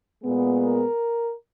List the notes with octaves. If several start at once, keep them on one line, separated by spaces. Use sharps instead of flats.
A#2 G#3 B3
A#4